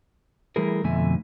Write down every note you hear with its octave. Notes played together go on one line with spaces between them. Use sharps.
E3 G3 A3 E4 G#4 A#4
F2 B2 D3 A3 E5 G#5